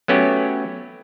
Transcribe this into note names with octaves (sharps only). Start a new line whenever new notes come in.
F#3 A3 B3 C#4 F#4 G4